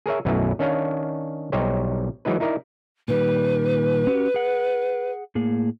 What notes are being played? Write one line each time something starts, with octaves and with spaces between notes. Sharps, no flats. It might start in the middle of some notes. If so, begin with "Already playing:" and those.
G#4 A#4 C#5 E5
B1 F#2 B2 A3 E4 B4
D#3 C#4 D4 C#5 F5
B1 G3 D#4 G4 C5 C#5
E3 F#3 G#3 D#4 B4
D#4 E4 A#4 D5
A#2 D#3 G3 B4
C#4 F#4 G4
G#4 F#5
A2 A#3 G#4